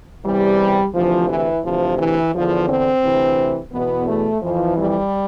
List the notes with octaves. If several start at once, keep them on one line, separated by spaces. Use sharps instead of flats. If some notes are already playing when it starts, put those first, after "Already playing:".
E2 C3 E3 G3
D2 C3 E3 F3
E3
D2 C3 E3 F3
E3
E2 D3 F3
C4
D2 C3 E3
E2 B2 B3
A3
F2 E3 F3
G3